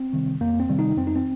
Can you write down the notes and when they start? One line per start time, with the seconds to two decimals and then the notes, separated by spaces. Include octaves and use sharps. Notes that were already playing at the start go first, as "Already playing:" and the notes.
Already playing: C4
0.13 C3 D#3 G3
0.41 F2 A#3
0.60 C4
0.68 C3 D#3 G3
0.79 D#4
0.96 F2 C4
1.07 D#4
1.16 C4